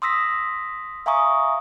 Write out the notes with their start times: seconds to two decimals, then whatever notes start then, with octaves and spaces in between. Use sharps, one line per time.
0.02 C6 D#6 E6 A#6 B6
1.06 E5 F5 G#5 A#5 C#6 D#6